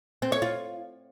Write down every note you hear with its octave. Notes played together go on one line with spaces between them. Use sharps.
C4
C#5
F4